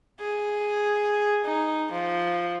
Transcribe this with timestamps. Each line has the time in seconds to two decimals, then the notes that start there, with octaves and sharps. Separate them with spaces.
0.20 G#4
1.45 D#4
1.92 F3